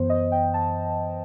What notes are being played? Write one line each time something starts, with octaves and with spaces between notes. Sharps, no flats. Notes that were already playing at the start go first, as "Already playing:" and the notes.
Already playing: F#2 E3 B3 C5
D#5
G5
A5